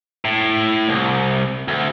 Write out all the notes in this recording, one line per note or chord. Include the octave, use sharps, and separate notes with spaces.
A2
C2
D2